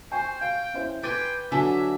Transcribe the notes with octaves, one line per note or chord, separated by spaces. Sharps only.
C5 G5 G#5 C#6
F5 G5
C#4 E4 C5
B4 G5 G#5 C6 D6 A6
D3 F#3 D4 E5 G#5 A5